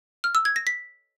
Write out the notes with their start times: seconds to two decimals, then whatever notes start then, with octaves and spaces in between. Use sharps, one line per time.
0.24 F6
0.35 E6
0.45 G#6
0.56 A#6
0.67 B6